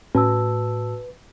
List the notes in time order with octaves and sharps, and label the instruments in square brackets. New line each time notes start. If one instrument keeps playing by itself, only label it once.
[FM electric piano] A2 [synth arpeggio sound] C#4 [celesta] F#4 A5 E6 [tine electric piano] B4